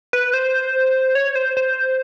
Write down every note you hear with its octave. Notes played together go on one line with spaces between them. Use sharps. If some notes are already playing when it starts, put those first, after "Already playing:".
B4
C5
C#5
C5
C5